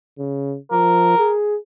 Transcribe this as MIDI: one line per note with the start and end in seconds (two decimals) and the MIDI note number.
0.18 0.56 49
0.71 1.14 53
0.71 1.32 70
1.18 1.56 68